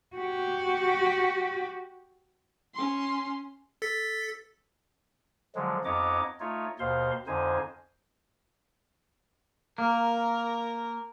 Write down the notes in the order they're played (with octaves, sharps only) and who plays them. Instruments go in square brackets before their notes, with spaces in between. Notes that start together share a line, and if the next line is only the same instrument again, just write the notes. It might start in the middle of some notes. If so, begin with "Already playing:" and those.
[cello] F#4 G4
[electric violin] C#4 C6
[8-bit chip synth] A4 A6 B6
[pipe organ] D3 F3 F#3 G#3
F2 B3 D#4 C#5 D#5 D6
A3 D#4 F4 C#5
D#2 B2 C5 F5 C6
F2 D3 D#4 C5 G#5
[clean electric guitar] A#3 [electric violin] A#4